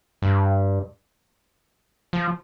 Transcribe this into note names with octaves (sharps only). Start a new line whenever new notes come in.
G2
F3